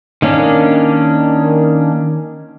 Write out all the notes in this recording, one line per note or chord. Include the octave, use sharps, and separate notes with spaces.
D#3 A#3 C#4 D4